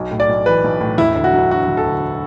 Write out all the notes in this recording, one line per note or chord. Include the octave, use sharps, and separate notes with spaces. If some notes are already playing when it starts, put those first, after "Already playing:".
Already playing: B1
A2
D5
B1
E3 B4
B1
A2
E1 E4
D2
F#4
F#3
D3 F#4
E1
A4
D2